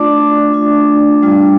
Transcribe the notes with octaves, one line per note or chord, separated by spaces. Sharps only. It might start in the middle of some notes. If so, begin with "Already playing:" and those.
Already playing: A3 D4 F4 D5 D6
A3 D4 F4
G3 D4 F4